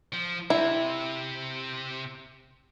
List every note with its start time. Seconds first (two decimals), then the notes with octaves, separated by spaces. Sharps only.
0.13 F3
0.50 C3 E4